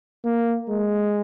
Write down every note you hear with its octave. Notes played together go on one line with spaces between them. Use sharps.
A#3
G#3